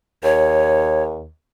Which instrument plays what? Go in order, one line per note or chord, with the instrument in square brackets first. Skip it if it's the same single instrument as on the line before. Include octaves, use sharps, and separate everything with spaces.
[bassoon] D#2 [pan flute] C#5